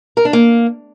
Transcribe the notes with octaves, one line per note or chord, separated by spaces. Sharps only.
A#4
D4
A#3